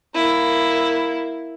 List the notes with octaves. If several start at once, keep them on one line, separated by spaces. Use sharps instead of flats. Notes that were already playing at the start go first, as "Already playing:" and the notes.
A#3 E4